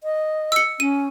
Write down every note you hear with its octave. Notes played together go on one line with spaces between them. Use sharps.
D#5
E6 C#7
C#4 D#7